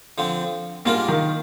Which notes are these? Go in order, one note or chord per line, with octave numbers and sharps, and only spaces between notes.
D3 F3 C4
G#2 G3 A#3 D4 F4 A#4
D#3